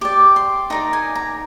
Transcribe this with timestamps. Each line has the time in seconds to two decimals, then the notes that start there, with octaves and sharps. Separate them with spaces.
0.01 G4 D5 D6
0.36 C6
0.70 D#4 A#4 D5 A#5
0.93 G#5
1.15 A#5